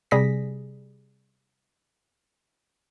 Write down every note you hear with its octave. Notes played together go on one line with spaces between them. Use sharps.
C3 G3 G#4 A#6 B6